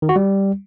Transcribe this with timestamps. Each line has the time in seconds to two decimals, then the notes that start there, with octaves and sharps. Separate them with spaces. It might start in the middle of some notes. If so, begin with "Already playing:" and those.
0.02 D#3
0.09 F#4
0.16 G3